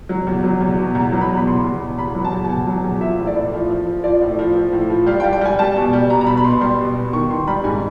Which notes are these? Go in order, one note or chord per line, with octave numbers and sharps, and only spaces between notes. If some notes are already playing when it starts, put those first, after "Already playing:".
F#3
E2
F#3
E2
B2
E2 A#5
F#3
B5
B2
B5
E2 C6
E2
B2
E2 B5
F#3
A5
E2
A5
E2 G#5
F#3
E2
F3 E5
A2
D5
A2
F3
F3
F3
F3 D5
A2
F3
F3
A2
F3
G3 F5
G5
G3
G5
G3 G#5
G3 A5
B2
G3
B2 A#5
A#5
B2 B5
B5
B2 C6
G3 C6
B2
B2
D#3 C#6
D#3 C6
G3 B5
G#2 G#5